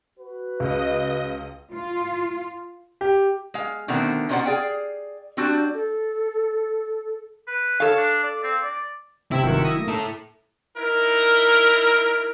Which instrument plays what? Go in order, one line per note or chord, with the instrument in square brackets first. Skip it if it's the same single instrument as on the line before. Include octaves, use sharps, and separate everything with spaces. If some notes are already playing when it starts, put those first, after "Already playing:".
[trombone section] F#4 B4
[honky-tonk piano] C#2 [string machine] D#5
[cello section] F4
[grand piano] G4
[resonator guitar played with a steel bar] G#3 F5
B2 D3 D#3 A3 B3 C4
B2 C#4 D#4 C5 D5 F#5
G#4 D5 F5 G5
G3 C4 D4 F#4
[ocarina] A4
[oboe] B4
[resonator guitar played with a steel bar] A4 F5 [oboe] C#5
[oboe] D4
D5
C4
D5
[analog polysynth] C3 C4 B6 [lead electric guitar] E4 [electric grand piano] E5
[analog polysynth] G1 C3 C#7 [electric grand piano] D#3 F#3 F#4
[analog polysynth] D#6 A#6
[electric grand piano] A3 A#3
[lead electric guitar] E4 A4 [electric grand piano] A#5
[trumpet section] D#4 E4 A#4